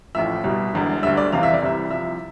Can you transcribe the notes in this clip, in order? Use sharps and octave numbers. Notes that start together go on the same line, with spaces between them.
A1 A2 F3 E5
C2 B2 G3
E1 E2 D3
D2 D3 G3 E5
D5
F1 E2 C3 E3 F5
E5
D5
C2 C3 E3 G3 E5
C2 C3 F3 E5